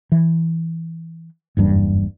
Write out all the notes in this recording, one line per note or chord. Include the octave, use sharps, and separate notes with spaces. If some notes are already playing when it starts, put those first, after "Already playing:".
E3
F#1 E2 G2